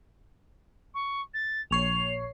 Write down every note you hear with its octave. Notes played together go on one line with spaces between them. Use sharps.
C#6
A6
A#1 C#5 C7 F7